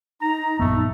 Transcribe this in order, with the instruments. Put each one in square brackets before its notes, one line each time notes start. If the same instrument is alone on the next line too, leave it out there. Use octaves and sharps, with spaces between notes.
[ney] D#4 [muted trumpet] A#5
[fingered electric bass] A#1 F#2 B3 [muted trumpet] A3